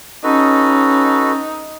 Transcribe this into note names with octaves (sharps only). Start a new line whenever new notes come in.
C#4 D#4 F#4 A4 B4